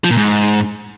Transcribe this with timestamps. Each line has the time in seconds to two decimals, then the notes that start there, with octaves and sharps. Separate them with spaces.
0.04 F3
0.11 A#2
0.17 G#2